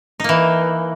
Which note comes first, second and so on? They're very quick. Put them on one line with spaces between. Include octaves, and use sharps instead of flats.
D#4 A#3 E3